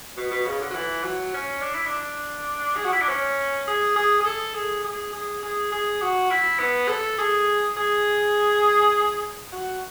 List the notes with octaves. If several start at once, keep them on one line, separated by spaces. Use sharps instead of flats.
B2
B2
C#3
D3
F#3
E3
F#3
C#4
D4
E4
D4
G#4
F#4
E4
D4
C#4
G#4
G#4
G#4
A4
G#4
G#4
G#4
G#4
G#4
F#4
E4
B3
A4
G#4
G#4
F#4